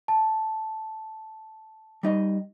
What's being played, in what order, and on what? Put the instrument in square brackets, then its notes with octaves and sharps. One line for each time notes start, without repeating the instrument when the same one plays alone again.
[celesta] A5
[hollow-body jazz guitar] G3 D#4 D#5